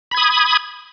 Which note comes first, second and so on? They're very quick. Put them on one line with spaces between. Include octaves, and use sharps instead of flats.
B5 G#6 D#6